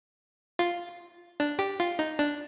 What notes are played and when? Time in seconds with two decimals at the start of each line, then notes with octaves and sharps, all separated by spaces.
0.59 F4
1.40 D4
1.59 G4
1.80 F4
1.99 D#4
2.19 D4